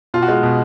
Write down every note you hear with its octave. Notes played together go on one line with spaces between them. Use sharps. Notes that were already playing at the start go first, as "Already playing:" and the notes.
B2 F4
F#4
G#3 F4
B2